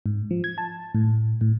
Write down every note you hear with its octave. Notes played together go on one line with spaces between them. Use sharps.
G#2
F3
G#6
A5
A2
A2